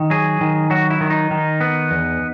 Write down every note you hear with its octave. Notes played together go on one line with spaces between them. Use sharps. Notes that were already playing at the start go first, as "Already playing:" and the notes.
Already playing: D#3
F#3 G#4
D#3
F#3 F#4
E4
D#3
D#4
D#3
B3
E2